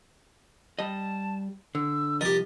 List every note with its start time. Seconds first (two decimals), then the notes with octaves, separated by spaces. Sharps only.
0.79 G3 D#5 A5
1.75 D3 E6
2.21 C2 F3 G4 A#4 D#5 A6